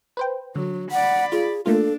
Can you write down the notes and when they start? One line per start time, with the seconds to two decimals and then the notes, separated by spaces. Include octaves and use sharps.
0.17 B4 C5 G5
0.55 D3 F#3
0.91 D5 F#5 B5
1.32 F4 G#4
1.66 A3 A#3 D4 F4 A4